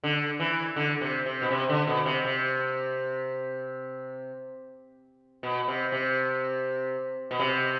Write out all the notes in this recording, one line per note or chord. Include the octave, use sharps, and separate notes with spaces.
D3
E3
D3
C3
C3
B2
C3
D3
B2
C3
C3
B2
C3
C3
B2
C3